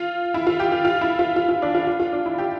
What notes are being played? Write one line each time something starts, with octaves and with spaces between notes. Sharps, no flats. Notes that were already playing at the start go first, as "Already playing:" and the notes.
Already playing: F4
E4
F4
G4
F4
F4
E4
F4
F4
F4
D4
F4
F4
F4
D4
E4
G4